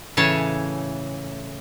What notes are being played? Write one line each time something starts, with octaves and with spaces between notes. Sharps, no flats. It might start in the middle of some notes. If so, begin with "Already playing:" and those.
A2 C#3 E3 C#5 G#5 A5